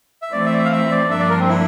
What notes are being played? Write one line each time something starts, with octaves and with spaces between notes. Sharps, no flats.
E5
E3 A3 C4 D5
E5
D5
E5
F5
E5
D5
G2 F3 A#3 D4 E5
D5
A#4
C4
E4